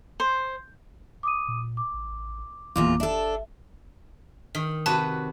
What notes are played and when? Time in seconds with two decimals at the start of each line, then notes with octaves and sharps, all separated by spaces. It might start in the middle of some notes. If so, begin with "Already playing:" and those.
0.20 C5
1.23 D6 D#6 D#7
1.48 A#2
1.77 D6
1.93 A1
2.76 G1 E2 A#2 F4 D6
3.00 D4 A4 E5
4.55 D#3
4.86 C3 F#4 B4 A5